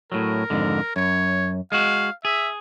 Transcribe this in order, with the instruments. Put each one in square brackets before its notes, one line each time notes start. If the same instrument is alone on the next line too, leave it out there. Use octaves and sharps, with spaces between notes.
[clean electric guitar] A2 F#3 [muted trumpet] A#4
[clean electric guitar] F2 G#2 D3
[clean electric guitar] F#2 [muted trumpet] C#5
[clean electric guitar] G#3 F#4 [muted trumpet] F5
[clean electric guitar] G#4 [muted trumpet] E5